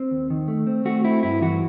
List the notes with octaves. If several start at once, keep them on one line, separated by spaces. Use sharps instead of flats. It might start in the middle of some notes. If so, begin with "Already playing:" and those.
Already playing: C4
D#2
D#3
A3
C4
A3 F#4
C4 E4
G2 E4
E3 F#4